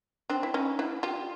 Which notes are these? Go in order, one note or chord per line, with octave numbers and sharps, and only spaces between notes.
C4 D4
E4
C#4 D#4
D4 E4
F4 G4